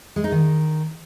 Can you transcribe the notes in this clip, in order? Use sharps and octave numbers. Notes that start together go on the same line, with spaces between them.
G#3
D#4
D#3